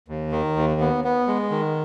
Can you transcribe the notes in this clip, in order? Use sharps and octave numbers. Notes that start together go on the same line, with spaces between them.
D#2
D#3
D#2
B3
B3
G#3
D#3